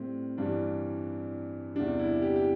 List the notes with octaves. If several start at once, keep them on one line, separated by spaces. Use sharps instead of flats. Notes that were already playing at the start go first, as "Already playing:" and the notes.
Already playing: A2 G3 C4
G2 E3 G3 D4
E2 C3 G3 D4
E4
G4
G4